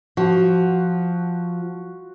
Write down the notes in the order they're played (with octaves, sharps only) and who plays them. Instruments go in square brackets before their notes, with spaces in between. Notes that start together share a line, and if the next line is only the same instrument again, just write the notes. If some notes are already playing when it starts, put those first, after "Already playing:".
[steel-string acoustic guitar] F3 [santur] F#4